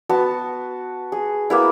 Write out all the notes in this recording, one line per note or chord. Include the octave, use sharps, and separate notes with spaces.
B3 F#4 A5
G#4
A#3 B3 E4